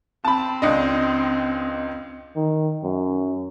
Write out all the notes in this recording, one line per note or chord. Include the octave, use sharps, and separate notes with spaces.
C4 A5 B5
C#2 D4 D#5
D#3
F#2